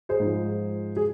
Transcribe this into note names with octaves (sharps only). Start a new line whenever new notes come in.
G#4 C5
G#2 F3
G#4